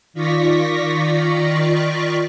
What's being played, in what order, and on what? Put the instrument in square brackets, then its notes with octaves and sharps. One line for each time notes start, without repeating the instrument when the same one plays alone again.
[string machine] D#3 F4 D5 C#6 A#6 B6